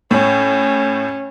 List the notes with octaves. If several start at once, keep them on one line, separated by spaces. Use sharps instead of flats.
A2 C#4